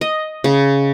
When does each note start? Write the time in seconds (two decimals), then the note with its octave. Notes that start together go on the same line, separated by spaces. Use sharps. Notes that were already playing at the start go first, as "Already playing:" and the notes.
0.01 D#5
0.44 C#3